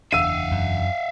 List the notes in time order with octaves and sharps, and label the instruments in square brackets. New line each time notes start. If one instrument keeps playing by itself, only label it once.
[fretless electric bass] F#1 E2 D4 [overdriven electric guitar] E5 F5 [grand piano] E6 D#7
[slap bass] F#2